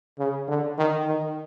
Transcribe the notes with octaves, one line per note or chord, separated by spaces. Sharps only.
C#3
D3
D#3
D#3